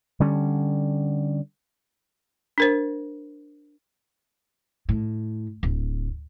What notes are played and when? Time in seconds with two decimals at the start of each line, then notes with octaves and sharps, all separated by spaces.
0.20 D3 G3 C#4
2.58 D4 A#4 C5
4.89 A2
5.63 D1